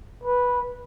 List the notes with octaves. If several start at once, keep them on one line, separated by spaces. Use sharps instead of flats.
B4